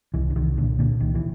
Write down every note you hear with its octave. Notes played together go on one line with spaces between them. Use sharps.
C2 E3
D3
C2 D#3
A#2 D3
A#2 D3
C2 D#3
E3